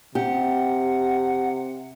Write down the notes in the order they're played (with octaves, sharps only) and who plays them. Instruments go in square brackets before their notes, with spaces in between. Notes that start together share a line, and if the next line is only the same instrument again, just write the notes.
[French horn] C3 [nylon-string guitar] G4 [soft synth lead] F#5